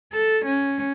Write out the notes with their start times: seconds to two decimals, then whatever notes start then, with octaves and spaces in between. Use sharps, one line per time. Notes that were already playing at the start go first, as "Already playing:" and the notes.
0.13 A4
0.45 C#4